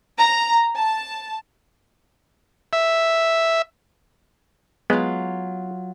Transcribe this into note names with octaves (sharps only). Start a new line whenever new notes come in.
A#5
A5
E5
F#3 G#3 B3 F4